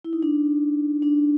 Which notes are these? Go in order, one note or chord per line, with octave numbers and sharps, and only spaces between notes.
E4
D#4
D4
D4